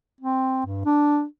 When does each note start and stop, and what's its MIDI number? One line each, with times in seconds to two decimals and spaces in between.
0.21 0.61 60
0.66 0.84 43
0.85 1.24 62